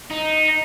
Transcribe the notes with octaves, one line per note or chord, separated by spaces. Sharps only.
D#4